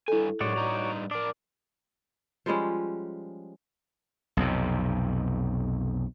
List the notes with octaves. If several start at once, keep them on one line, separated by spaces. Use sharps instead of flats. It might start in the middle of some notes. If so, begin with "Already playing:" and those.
G2 E4 A4 G#5
F#2 A2 G#3 F#4 C#5 D5
G2 D#4 A#5
D4 A#4 D5
F3 G3 G#3 C#4
B1 F2 C3